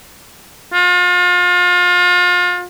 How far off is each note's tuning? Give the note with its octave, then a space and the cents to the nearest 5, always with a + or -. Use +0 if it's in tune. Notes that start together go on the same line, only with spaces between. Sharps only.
F4 +35